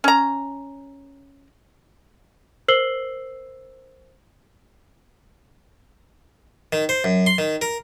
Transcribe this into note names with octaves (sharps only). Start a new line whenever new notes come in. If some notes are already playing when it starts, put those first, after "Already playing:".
C#4 A#5
A#4 C5 E6 C7 F#7 G7
D#3
C5
F#2
C6
D#3
A#4